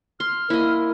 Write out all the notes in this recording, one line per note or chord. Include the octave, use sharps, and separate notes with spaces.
C6 F6
A#3 E4 D#5